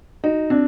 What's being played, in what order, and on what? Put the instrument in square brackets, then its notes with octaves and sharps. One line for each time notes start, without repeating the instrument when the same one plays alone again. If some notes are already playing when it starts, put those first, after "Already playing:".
[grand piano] D#4 [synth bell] F#4
[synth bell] C4 [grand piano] D4